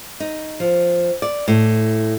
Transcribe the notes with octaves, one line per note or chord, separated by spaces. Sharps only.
D#4
F3
D5
A2